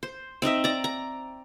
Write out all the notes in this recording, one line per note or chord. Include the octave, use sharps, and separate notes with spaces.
C5
C4 D#4 D#5 E5
D5 A#5
A#5